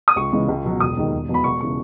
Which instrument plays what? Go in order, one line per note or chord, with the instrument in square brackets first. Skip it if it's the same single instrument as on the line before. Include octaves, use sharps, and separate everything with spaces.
[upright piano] D#6
C#2 C#6
C#3 E3 G#3
C#2
B2 F#3
E1 D#6
D#2 D#3 G#3
E1
E2 B2 F#3
B5
E1 C#6
C#3 E3 C#6